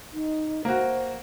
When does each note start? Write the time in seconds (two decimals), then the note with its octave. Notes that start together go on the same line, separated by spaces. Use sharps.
0.14 D#4
0.65 A#3 F#4 C5